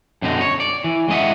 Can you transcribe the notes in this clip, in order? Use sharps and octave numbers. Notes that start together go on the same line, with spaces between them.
F#2 B2 D3 D#4
C#5
D5
E3
G#3 C#4 D#5 E5 F#5